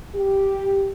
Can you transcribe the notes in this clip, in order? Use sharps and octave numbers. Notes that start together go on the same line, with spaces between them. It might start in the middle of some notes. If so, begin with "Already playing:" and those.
G4